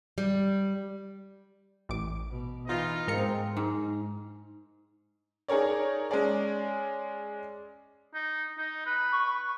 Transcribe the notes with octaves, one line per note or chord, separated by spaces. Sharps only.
G3
A1 D6
B2
E3 D#4 F4 D#5
G#2 G#3 C4 A#4 C#7
G#2
D#4 G#4 A#4 C#5 D5
G#3 C#4 G#4 D5
D#4
D#4
B4
C#6